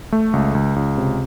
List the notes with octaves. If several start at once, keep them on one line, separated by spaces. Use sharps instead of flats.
A3
C#2
C#2
C#2
C3